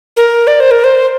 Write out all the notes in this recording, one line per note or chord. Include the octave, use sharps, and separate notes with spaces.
A#4
D5
C5
A#4
C5